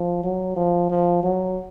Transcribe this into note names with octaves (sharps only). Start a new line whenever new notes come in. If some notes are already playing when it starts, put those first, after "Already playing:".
Already playing: F3
F#3
F3
F3
F#3